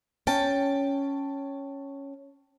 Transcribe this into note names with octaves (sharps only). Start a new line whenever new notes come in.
C#4 G5 A5